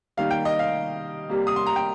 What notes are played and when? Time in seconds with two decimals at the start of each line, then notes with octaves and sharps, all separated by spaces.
0.17 D#3 G3 A#3 F5
0.31 G5
0.45 D#5
0.59 F5
1.29 C3 G3 A#3
1.47 D#6
1.56 C6
1.67 A#5
1.76 G5